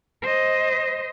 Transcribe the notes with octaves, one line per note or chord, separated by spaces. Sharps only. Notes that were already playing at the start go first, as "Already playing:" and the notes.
C5 D#5